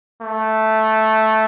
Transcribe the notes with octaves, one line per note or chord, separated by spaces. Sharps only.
A3